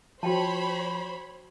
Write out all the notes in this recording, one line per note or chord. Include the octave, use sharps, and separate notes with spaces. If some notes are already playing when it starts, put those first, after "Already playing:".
F3 F#4 C5 C#5 G5 A5 B5